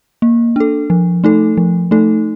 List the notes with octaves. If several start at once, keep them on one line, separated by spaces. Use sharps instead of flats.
A#3
D4 A4
F3
A3 D#4 A4
F3
A3 D#4 A4